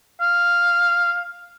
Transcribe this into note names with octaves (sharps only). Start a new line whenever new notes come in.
F5